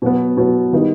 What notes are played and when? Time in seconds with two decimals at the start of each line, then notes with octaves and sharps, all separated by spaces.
0.02 B2 F#3 B3
0.37 B2 F#3 B3
0.73 D#3 G3 B3 D#4